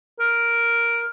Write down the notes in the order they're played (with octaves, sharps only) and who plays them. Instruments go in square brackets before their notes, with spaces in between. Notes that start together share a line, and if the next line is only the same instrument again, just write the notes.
[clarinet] A#4